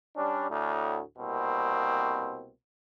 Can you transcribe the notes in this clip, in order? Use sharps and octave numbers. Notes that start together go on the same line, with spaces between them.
G3 C#4 D4
D2 A2
C2 B2 A#3 C4